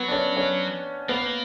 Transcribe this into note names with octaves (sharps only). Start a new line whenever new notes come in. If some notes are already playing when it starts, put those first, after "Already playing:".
Already playing: F#3 B3
D4
C#4
C#4
A#3 B3